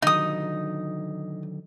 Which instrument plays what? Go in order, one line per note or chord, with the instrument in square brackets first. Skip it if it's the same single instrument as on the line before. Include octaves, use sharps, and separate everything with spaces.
[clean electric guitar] D3 D#3 F#3 [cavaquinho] D#4 D#6